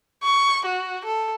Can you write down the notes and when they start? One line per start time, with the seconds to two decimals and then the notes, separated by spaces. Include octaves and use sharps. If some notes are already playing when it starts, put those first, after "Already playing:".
0.23 C#6
0.65 F#4
1.05 A4